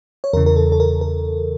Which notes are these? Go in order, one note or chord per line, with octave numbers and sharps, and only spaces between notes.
C#5
E2 C#3 E3 A#4
A#4
A4
A4
A#4
A#4